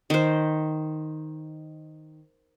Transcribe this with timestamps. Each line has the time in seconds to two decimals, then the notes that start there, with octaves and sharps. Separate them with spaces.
0.10 D#3 C5